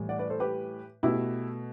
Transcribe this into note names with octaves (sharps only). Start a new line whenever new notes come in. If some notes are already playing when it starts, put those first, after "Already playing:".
Already playing: A2 E3 G3
D5 F#5
B4 D5
A4 C5
G4 B4
B2 A3 E4 G4